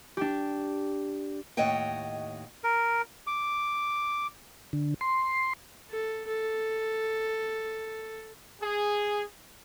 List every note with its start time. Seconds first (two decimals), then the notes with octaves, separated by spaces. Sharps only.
0.17 D4 G4
1.57 D#2 A2 C#5 D#5 F#5 G5
2.64 A#4
3.27 D6
4.73 D3
5.01 C6
5.90 A4
6.27 A4
8.61 G#4